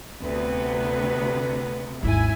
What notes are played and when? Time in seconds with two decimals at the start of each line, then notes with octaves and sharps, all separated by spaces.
0.21 D2 C3 B3 B4
2.03 G#1 D#2 E4 G#5